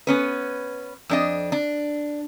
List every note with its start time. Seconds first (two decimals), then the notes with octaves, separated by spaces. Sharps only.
0.07 B3 C#4 B4
1.09 F2 D4 D#5
1.52 D4